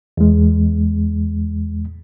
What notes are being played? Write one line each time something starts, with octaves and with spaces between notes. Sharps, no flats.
E2 G#3